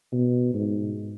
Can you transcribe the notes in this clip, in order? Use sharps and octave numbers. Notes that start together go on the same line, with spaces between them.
B2
G#2